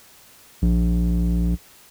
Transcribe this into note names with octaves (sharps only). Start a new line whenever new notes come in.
A#1